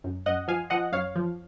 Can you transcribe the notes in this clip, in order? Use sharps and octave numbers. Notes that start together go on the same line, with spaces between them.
F#2
F#2 D#5 F#5
F3 F5 G#5
F3 D#5 F#5
F#2 C#5 F5
F3